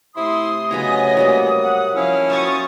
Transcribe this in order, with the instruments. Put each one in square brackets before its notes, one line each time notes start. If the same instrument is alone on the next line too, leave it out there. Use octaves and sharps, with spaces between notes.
[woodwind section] C3 A3 D#6 [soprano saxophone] E4 [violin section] C6
[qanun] C#3 F#3 C#5 [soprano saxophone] B3 [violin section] D#5 G#5 A#6
[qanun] F#3 G3 A#3
[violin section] F#5
[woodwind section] F3 E4 [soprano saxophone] C#4 [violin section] F5
[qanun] F#4 C5 E5 [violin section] C#6 D#6 A6